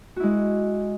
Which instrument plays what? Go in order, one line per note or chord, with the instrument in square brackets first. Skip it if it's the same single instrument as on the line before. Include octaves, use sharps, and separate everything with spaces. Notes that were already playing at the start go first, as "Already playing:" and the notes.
[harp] F#4
E4
G#3